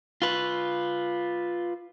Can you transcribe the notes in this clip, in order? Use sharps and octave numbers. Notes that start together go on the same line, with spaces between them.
F4 B4